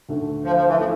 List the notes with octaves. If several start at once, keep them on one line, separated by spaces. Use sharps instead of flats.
D2 D3 A3
F3
F3
E3
E3 F3 A3